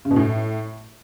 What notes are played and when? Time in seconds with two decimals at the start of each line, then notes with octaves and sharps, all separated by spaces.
0.05 C#3
0.11 B2
0.16 A2